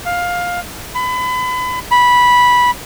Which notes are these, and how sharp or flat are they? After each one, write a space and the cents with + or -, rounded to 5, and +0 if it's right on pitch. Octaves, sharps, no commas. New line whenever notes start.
F5 +15
B5 +30
B5 -10